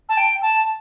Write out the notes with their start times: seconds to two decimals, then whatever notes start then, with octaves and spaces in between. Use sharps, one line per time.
0.09 A5
0.17 G5
0.42 A5